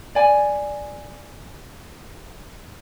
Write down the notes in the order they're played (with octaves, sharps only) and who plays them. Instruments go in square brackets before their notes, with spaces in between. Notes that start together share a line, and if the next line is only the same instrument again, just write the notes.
[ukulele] D5 G#5